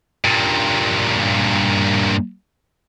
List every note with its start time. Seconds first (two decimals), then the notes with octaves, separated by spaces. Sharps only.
0.24 G2 A#2